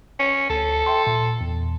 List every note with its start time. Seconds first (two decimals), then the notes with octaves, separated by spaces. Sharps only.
0.20 C#4
0.50 D2 A4
0.86 E5 G5 C6
1.07 A#2
1.41 E2